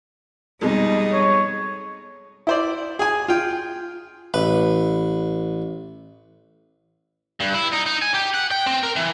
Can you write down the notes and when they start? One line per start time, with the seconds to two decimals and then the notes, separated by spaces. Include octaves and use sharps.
0.61 F2 B2 G3 G#3 D#4
1.13 C#5
2.47 E4 C5 D5
2.99 G#4 G#5
3.28 F4 G5
4.34 A1 B4
7.40 G2
7.55 E4
7.73 D#4
7.86 D#4
8.02 G#5
8.14 G4
8.34 F#5
8.51 G5
8.66 C4
8.83 A#4
8.96 E3